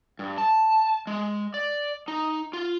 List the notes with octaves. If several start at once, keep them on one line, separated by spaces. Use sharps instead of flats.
G2
A5
G#3
D5
D#4
F4